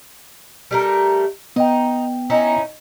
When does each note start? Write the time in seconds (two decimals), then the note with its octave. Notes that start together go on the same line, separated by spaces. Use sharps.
0.71 G3 A3 A#4
1.56 B3 D#4 G5
2.30 C#4 D#4 E4